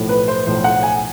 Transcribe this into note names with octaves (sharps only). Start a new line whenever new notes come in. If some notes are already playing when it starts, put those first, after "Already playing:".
Already playing: B1 A2 F3
B4
C5
B1 A2 F3 C5
F#5
G#5